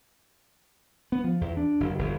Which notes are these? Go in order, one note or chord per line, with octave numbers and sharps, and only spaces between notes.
B3
F3
E2
D4
F#1
G1